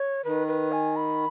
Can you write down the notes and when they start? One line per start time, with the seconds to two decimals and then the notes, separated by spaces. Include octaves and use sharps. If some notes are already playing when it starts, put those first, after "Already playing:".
Already playing: C#5
0.24 D#3 B4
0.48 B4
0.72 G#5
0.96 B5